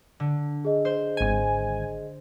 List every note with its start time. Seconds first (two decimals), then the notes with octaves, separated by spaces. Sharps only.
0.20 D3
0.65 G#4 D#5
0.85 C5
1.17 G#1 G#5